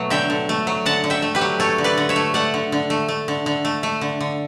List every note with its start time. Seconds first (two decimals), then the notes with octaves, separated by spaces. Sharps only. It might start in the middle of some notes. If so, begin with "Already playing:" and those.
Already playing: B2 F#3 A3
0.10 D3 E5 G5
0.30 D3
0.49 A3
0.67 F#3
0.86 D3 F#5 A5
1.04 D3
1.10 E5 G5
1.22 A3
1.35 G4 B4
1.41 F#3
1.60 A3 A4 C#5
1.78 D3
1.84 B4 D5
1.98 D3
2.09 C#5 E5
2.16 A3
2.34 A3 D5 F#5
2.54 D3
2.72 D3
2.90 A3
3.08 A3
3.28 D3
3.46 D3
3.65 A3
3.83 A3
4.01 D3
4.21 D3